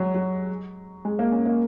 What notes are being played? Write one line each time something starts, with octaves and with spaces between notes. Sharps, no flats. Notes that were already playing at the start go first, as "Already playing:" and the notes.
Already playing: F#3 G#3
F#3
G#3
A#3
C#4
A#3